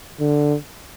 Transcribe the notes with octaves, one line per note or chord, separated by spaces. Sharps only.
D3